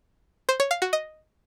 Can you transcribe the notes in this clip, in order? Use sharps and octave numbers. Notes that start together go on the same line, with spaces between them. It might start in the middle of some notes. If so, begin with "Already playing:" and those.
C5
C#5
F5
F#4
D#5